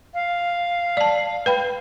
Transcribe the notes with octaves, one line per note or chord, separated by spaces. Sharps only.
F5
D5 A5
B4 G5 B5